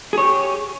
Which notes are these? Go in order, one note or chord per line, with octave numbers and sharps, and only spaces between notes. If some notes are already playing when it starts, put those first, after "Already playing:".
G4 G#4 C#5